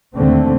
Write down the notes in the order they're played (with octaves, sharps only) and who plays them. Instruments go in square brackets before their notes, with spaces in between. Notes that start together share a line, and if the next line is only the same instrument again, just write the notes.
[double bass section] D#2 D3 A3 C4